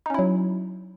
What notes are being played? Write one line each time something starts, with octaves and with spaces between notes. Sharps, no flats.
F#3 C#4 D#4 E4